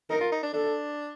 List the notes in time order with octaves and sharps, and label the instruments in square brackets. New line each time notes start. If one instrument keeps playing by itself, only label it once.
[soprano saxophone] D#4 [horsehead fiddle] A#4
[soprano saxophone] F4
D#4
D4
[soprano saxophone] D4 [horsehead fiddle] A4